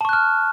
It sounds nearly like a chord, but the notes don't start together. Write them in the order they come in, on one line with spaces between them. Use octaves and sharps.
A5 C#6 F#6 F6